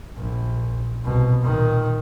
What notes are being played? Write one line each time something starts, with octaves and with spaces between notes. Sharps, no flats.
A#1
C2 B2
A#2 D#3